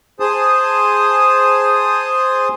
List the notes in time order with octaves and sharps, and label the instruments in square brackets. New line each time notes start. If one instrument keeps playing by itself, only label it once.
[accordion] G#4 C5 A5 D#6